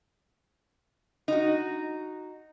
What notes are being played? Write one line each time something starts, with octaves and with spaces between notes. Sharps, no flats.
D#4 F#4